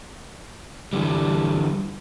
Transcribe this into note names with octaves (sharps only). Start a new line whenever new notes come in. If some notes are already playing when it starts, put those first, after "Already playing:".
D3 E3 G3